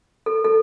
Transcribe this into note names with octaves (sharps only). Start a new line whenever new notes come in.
A4
A4